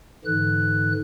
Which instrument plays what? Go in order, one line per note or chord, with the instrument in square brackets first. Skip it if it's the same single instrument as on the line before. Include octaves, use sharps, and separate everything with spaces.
[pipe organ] G#2 D3 E3 F#6